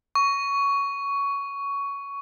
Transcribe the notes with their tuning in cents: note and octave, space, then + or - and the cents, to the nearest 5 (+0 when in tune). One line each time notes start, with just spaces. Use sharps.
C#6 +15